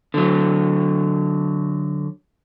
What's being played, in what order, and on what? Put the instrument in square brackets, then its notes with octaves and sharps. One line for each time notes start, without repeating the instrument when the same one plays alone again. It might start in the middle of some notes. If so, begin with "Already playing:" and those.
[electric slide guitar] D3 F#3